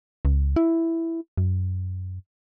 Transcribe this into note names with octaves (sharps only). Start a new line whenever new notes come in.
C#2
E4
F#2